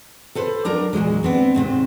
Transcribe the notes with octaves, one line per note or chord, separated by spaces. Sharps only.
A4 B4 C5
F#3 D4 A#4 A#5
E2 A#2 F#3 G#3
B3 C4 D4
D#2 G#2 C3 C5